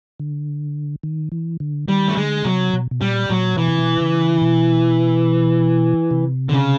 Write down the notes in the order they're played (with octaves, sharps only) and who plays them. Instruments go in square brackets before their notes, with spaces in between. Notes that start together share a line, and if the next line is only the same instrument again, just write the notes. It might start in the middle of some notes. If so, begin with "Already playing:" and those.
[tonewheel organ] D3
D#3
E3
D3
[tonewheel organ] D#3 [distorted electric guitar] G3
[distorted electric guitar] A3
[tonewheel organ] D3 [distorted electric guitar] G#3
[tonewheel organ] C3 [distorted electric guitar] F#3
[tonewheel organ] B2
B2
[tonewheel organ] A#2 [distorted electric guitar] G3
[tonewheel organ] A#2 [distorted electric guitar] F#3
[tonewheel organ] B2 [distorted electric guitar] E3
[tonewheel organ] C3
B2
C#3
B2
C3
[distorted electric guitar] D3
C#3